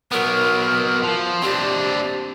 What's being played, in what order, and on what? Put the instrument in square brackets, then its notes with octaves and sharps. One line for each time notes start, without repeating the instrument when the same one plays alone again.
[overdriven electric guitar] F#3 B3 [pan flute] A#4
[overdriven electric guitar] F3
[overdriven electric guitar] C4 D4 [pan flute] G4